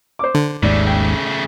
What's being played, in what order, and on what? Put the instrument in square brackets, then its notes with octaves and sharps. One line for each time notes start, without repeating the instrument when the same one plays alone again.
[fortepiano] C5 D6
[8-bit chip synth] D3
[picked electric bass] G#1 D#2 G#2 [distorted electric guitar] C#3 A3 [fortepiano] D5
[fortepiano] G5